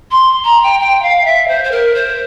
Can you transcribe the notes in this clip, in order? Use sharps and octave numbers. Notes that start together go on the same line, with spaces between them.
C6
A#5
G5
G5
F5
E5
C5
C5
A#4
C5